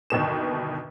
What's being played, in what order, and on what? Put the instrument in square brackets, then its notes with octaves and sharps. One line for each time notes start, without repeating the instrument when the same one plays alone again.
[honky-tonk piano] G1 D#2 B2 E7